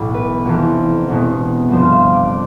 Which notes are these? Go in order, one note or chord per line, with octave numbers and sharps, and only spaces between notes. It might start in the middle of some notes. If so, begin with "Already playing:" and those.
Already playing: B1 A2 E3
B4
F1 F2 C3 E3
E1 E2 B2
G1 F2 C3 F3 C5
F5
E5
D5
D5